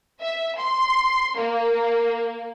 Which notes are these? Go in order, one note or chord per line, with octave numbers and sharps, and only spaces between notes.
E5
C6
A#3